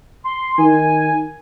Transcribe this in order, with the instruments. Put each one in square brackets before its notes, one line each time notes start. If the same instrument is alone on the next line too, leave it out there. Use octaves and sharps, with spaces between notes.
[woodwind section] C6
[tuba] D#3 [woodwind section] G#5